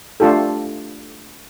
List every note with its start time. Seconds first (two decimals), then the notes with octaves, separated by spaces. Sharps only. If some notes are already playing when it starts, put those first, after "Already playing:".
0.20 A3 D4 F4 G4 A4